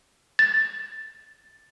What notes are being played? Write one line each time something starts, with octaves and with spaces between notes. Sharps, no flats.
A6